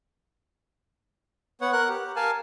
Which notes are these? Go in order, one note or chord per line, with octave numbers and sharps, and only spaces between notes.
B3 C#5 F#5
A#4 F#5 F#6
G4
A#4 F5 G#5 A5